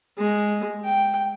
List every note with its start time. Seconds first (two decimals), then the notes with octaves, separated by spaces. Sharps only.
0.18 G#3
0.84 G5